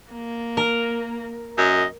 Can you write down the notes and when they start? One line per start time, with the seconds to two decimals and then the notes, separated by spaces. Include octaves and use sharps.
0.11 A#3
0.57 A#4
1.58 F#2 D#5